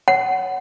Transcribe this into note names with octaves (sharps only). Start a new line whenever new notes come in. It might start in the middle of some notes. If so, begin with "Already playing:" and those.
F#5